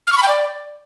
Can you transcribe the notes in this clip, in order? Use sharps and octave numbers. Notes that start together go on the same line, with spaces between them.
F6
C#6
B5
G5
D5